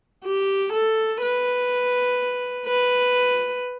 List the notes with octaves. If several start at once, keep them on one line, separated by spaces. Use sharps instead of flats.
G4
A4
B4
B4